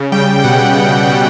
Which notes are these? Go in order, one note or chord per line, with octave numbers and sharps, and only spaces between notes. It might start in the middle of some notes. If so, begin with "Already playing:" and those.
Already playing: C#3
G3 G5
B2 F#5
B2
G3